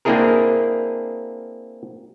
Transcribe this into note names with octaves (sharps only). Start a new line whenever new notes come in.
A#3 C4 D4 E4 G#4 A#4